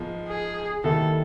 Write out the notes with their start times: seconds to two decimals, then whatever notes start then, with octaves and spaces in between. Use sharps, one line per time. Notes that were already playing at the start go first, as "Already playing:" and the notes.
Already playing: G#2 F3 G#3 B3
0.28 G#4
0.84 D#2 D#3 G3 B3 E4 A4